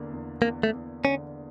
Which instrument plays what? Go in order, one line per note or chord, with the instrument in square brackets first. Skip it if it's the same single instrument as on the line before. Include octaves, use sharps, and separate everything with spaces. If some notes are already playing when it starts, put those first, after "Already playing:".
Already playing: [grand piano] E2 D3 A#3
E2
[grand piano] E2 [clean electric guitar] A#3
[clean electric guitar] A3
[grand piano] E2
[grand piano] D3 [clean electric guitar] C#4